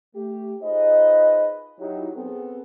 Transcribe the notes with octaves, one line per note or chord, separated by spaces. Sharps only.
A3 G4
D#4 F4 G#4 B4 C5 D#5
F#3 D#4 E4 G4
B3 C4 G#4 A4